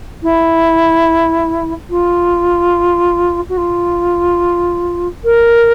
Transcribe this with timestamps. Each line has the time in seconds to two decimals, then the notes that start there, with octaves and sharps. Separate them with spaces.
0.23 E4
1.90 F4
3.49 F#4
3.57 F4
5.24 A#4